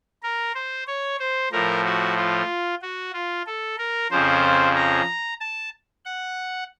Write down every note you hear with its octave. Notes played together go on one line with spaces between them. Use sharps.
A#4
C5
C#5
C5
A2 F3 A#4
F#4
F4
F#4
F4
A4
A#4
F2 C#3 F3 C5
A#5
A5
F#5